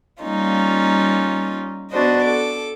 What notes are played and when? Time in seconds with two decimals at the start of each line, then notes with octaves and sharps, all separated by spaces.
0.23 G3 A#3 C#4 D#4 F4
1.91 B3 D4 F#4 C5 D#5
2.23 A4 D6